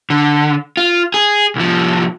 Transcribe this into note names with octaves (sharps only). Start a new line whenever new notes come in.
D3
F4
G#4
C2 F3